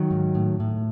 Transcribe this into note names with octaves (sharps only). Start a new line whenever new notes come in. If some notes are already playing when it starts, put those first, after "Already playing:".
Already playing: D#3 F#3
G#2
A2
A2